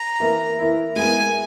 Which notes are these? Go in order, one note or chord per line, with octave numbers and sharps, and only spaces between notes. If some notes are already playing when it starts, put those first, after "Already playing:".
Already playing: A#5
E3 A#3 E4
E3 A#3 E4
G#3 B3 E4 A#4 G#5